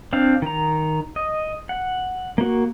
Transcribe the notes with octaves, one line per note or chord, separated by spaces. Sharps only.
C4 D4 F5
D#3 A#5
D#5
F#5
A#3 F#4